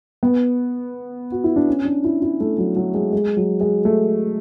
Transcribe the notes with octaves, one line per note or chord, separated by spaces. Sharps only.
B3
F#4
E4
D4
C#4
D4
E4
E4
A3
F#3
F#3
G#3
G#3
F#3
G#3
A3